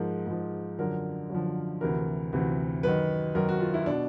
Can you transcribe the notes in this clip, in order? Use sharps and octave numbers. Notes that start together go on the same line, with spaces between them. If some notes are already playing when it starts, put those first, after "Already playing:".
Already playing: G#2 F3 A#4
G#2 F3
F#2 D3 F3 A#4
F#2 D3 F3
D2 C3 E3 A#4
D2 C3 E3
F#2 D#3 B4
F#2 D#3 A#4
F#4
F4
E4
B2 D4